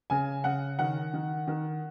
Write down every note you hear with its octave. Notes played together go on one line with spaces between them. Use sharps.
C#3 G#5
C#3 F#5
D#3 F#5
D#3
D#3